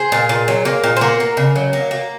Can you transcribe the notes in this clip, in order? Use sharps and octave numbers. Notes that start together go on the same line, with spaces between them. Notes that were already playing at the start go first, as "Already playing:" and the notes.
Already playing: G#4 C5
A#2
A#2
F#3
A#3
A#2
C5
A#3 F#4 A#4
A#3
C#3
F#3
A#3
A#3